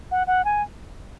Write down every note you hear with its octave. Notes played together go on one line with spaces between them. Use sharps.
F#5
F#5
G#5